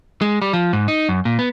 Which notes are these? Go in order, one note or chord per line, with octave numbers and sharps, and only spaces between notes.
G#3
G3
F3
G#2
D#4
F#2
A#2
B3